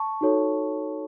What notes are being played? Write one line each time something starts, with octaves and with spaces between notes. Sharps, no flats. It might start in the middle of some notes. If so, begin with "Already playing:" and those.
Already playing: A5 C#6
D#4 F#4 A4 C#5